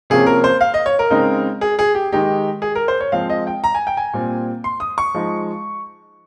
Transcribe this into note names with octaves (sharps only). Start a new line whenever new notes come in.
C3 F3 A#3 C#4 G#4
A#4
C5
F5
D#5
C#5
A#4
C#3 G#3 C4 D#4
G#4
G#4
G4
D#3 G#3 D#4 G4
G#4
A#4
C5
C#5
F3 G#3 C4 F5
D#5
G5
A#5
G#5
G5
G#5
A#2 G3 C4
C6
D#6
C#6
F3 G#3 D#4